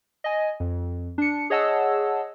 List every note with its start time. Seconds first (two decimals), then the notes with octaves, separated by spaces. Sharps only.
0.24 D#5 G#5
0.60 F2
1.18 D4 C#7
1.50 G#4 C#5 D#5 F#5 A5 E6